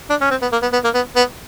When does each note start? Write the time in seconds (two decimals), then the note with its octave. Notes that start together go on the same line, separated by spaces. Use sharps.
0.10 D4
0.21 C#4
0.31 C4
0.42 B3
0.52 A#3
0.62 B3
0.73 B3
0.84 A#3
0.94 B3
1.16 B3